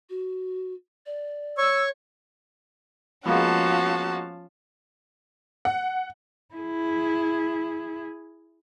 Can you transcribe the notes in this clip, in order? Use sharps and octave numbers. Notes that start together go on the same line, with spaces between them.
F#4
D5
C#5 C#6 E6
F3 G#3 A#3 B3 C#4 F#4 F5 A5
F#5
E4 G#4